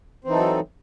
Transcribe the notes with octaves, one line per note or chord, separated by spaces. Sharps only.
E3 F#3 C4 D#4 A4